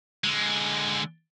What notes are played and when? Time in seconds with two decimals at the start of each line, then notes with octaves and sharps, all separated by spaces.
0.24 D3 G#3